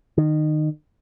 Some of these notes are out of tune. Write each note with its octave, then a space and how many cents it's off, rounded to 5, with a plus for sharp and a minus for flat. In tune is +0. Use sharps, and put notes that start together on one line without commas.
D#3 -25